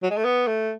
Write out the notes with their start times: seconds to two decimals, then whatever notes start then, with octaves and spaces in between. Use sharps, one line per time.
0.03 F#3
0.10 G#3
0.17 A3
0.24 B3
0.47 A3